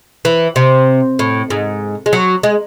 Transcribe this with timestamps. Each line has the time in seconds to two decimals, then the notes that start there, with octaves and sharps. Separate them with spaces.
0.25 E3
0.56 C3
1.19 A2
1.50 G#2
2.06 G#3
2.13 F#3
2.43 G#3